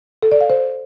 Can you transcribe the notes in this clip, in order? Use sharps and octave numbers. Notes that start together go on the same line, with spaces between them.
A4
D5
F5
C5